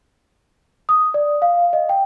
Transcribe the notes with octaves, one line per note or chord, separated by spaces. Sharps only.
D#6
D5
F5
D#5
G5